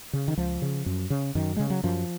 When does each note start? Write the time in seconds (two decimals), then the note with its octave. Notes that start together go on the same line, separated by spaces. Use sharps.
0.13 C#3
0.28 D#3
0.37 C#2 F3
0.62 C#3
0.86 F#2
1.10 C#3
1.35 F#2 D#3
1.56 C#3 G#3
1.70 F#3
1.83 F#2 F3